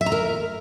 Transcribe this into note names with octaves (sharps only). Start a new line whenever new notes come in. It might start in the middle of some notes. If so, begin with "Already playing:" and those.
E5
A#5
A#4